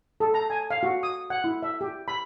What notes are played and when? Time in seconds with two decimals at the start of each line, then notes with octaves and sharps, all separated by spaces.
0.20 A4
0.34 A#5
0.50 G#5
0.71 F5
0.83 F#4
1.03 D#6
1.30 F#5
1.44 E4
1.63 E5
1.81 G4
2.08 B5